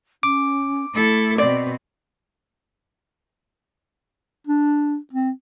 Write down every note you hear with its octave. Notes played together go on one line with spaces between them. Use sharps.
C#4 D6
A3 E4 A4
B2 C4 D5
D4
C4